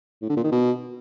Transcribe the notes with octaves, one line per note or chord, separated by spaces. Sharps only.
A2
D3
A#2
D#3
B2